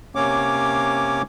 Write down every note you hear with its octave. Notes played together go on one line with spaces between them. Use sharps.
C3 A#3 C#4 C#5 D6